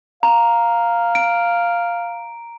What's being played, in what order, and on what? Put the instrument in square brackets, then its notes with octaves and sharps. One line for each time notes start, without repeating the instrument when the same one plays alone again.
[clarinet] F5 [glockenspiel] A#5
[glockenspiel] D7